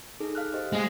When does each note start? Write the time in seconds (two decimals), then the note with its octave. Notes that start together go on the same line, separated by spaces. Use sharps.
0.20 D#4 G#4 A4
0.35 F5 F6 F#6
0.53 G4 C5 D#5
0.73 G#3